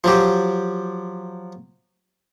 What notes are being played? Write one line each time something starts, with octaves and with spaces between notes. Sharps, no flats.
F3 F#3 G4